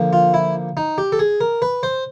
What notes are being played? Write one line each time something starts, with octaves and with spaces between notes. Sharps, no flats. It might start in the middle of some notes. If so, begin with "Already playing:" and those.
Already playing: D3 F3 A#3
F4
E4
D#4
G4
A4
G#4
A#4
B4
C5